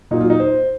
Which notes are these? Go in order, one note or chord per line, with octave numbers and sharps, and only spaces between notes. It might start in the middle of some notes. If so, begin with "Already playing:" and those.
A#2 F#3 D#4
F4
D#4
C5